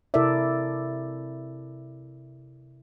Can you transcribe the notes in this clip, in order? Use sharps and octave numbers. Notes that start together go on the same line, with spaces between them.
C3 E4 A4 A#4 D5 E5